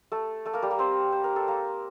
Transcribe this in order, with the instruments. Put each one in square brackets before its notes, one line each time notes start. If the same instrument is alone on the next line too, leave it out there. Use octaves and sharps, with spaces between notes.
[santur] A3 A4
A3 A4
A#3 A#4
G3 G4
A#3 A#4
C4 C5
C5
A#4
A4
A#3 A#4